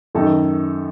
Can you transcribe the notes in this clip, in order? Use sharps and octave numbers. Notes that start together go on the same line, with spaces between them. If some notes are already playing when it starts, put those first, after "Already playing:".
F#2 D#3 A3 D#4 A4